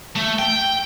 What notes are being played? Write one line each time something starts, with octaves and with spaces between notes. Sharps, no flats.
A3
G5